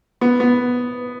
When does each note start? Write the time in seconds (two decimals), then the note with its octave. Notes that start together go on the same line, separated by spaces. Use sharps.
0.21 B3
0.40 B3